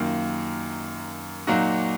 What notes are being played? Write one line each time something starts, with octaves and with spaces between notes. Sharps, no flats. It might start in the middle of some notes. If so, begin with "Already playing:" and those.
Already playing: F#2 D#3 A#3 F4
A#2 F#3 A#3 D#4 F#4